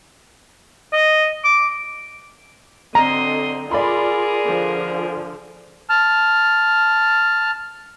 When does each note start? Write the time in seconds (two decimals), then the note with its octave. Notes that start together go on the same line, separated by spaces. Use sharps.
0.93 D#5
1.44 D6
2.95 D3 F#3 C4 D#5 A#5 C6 D#6
3.71 F4 G#4 A#4 D5 B5 C6
4.45 D3 F3
5.90 A5 F6